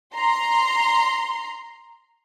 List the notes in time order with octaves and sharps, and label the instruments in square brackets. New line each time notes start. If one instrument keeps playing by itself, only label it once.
[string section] A#5 C6